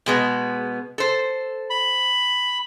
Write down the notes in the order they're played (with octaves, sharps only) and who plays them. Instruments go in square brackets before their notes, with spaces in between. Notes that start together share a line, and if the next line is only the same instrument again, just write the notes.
[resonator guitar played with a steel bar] B2 G#3 B3
A4 C5
[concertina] B5